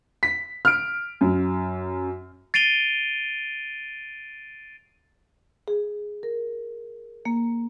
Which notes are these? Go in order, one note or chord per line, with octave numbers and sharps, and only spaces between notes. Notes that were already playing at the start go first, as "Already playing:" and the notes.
B6
F6 D7
F#2
A6 C7 D7 D#7 F7 G7
G#4
A#4
A#3